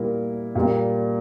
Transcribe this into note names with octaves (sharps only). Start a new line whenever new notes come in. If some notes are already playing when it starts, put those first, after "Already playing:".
Already playing: A#2 G3 A#3 E4 A#4
A#2 G3 A#3